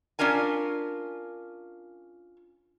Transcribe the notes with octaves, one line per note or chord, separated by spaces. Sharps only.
C#4 D4 F4 A#4 G#5